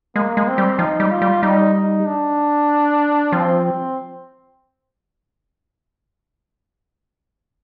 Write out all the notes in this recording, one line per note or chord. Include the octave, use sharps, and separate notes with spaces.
G#3 A#3
G#3
C4
G3
F3 D#4
G3
F4
G3
G3 D#4
D#4
D4
F3 C4
C4